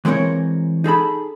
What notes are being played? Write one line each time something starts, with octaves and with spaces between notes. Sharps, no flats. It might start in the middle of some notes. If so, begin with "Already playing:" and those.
E3 G#3 C4 A#4 C#5
D#4 G#4 A4 B5